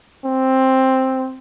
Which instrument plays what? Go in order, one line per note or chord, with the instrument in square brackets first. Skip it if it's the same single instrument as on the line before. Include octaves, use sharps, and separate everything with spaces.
[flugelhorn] C4